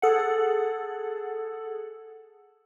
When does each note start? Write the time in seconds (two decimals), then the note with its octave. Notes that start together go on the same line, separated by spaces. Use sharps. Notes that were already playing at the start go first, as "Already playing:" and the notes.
0.02 G#4 A4 F#5